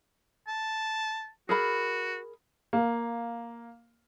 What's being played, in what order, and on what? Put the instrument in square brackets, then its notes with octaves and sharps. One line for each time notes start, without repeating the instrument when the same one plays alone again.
[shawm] A5
[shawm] F#4 [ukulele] G#4 A#4 B5
[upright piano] A#3 F5